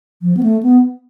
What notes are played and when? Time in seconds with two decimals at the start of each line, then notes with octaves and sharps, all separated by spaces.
0.22 F3
0.37 B3
0.43 A3
0.63 B3